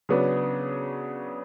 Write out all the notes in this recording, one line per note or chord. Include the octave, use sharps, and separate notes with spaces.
C#3 F#3 B3 D4